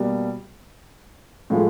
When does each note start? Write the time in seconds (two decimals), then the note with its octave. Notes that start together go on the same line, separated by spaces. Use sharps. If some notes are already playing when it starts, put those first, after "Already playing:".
Already playing: B2 G3 A#3
1.50 A2 F3 G#3